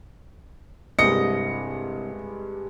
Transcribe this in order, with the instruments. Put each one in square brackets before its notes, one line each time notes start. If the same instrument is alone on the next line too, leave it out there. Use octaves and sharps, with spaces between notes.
[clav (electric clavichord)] C2 [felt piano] G2 G3 G#3 [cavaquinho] D#5 [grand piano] C#7